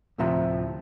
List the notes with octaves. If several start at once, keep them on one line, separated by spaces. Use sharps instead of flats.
D2 A2 C3 F3 E5 A#5